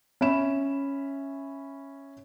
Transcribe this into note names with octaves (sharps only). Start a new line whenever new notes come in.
C#4 E5 B5 E7